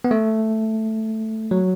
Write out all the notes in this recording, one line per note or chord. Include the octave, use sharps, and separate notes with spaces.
B3
A3
F#3